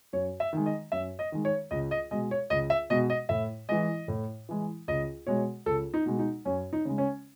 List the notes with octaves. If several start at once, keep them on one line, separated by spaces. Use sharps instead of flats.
F#2 C#5
E5
D#3 G#3
D#5
F#2 E5
D#5
D#3 G#3
C#5
C#2 D#5
D#5
B2 G#3 D#5
C#5
C#2 D#5
E5
B2 G#3 D#5
D#5
A2 E5
E3 G#3 D#5
A2
E3 G#3
C#2 D#5
B2 G#3 C#5
C#2 A4
D#4
B2 G#3
D#4
F#2 C#4
D#4
C#3 G#3
C#4